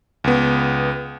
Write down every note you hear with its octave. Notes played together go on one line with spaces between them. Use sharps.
C#2 B3